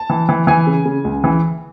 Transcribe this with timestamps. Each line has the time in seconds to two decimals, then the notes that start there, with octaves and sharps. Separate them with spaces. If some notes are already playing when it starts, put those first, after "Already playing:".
Already playing: A5
0.10 E3
0.29 E3
0.47 E3 G#5
0.67 C#3
0.85 C#3
1.05 C#2
1.24 E3